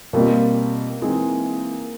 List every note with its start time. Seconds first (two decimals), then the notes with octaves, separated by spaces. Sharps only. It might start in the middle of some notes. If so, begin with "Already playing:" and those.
0.13 B2 G3 A#3 C4 F4
1.02 E3 G#3 C4 D#4 G#4